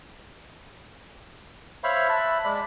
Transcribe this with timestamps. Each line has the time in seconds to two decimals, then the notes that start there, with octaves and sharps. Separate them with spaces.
1.84 C5 C#5 E5 F5 B5 C#6
2.09 E5 A5 B5 F#6
2.44 G#3 D5 B5